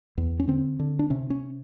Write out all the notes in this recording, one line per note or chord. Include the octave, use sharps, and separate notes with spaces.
E2
C#4
D3 C4
D3
D4
C3 C#4
C#4